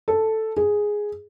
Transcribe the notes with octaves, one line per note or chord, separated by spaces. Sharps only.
A4
G#4